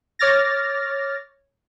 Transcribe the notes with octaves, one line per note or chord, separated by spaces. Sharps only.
C#5 D6 F6 A6 A#6